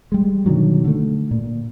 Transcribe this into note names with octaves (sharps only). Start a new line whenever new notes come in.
G3 G#3
B2 D3 D#3 F#3
D3 A3
A#2